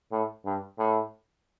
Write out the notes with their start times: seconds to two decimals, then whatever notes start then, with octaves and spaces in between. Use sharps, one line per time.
0.12 A2
0.45 G2
0.78 A2